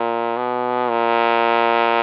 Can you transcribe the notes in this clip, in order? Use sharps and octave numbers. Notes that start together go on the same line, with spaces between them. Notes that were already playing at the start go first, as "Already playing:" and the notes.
Already playing: A#2
B2
A#2